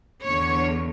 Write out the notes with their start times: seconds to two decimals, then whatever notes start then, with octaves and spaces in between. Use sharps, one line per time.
0.25 E2 D3 C#5